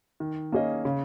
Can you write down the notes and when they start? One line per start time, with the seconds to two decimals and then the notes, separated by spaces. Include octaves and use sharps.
0.20 D#3
0.52 A#3 C#4 G#4 D#5
0.85 C#3